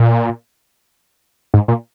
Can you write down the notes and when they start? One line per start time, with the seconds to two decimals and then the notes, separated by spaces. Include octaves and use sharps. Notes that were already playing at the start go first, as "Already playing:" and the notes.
Already playing: A#2
1.54 G#2
1.68 A#2